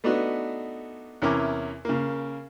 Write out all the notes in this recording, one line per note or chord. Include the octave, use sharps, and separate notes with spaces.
A3 B3 D4 D#4 F#4
E2 C3 C#4 E4 A#4 D6
C#3 A#3